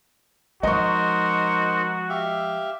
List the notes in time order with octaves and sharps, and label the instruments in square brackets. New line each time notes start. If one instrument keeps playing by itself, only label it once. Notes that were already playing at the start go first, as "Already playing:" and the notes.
[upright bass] F3 G#3 [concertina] D#4 A#4 C5 [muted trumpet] F#4 [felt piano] D#5 C#6
[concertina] G4 E5 F5